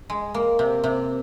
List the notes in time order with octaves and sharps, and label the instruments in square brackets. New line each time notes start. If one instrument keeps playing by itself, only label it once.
[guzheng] G#3
A#3
C3
C3